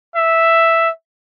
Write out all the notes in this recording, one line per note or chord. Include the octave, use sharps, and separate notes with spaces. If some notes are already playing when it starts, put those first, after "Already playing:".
E5